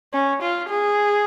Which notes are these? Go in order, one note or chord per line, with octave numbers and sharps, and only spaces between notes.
C#4
F4
G#4